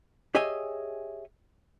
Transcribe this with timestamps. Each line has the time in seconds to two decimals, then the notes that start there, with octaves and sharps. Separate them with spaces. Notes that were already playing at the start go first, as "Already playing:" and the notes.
0.35 G4 G#4 C#5 D#5 E5 G#5